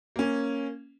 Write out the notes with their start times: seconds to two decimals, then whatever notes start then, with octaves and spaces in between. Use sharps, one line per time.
0.16 A#3 C#4